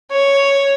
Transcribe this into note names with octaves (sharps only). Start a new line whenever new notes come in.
C#5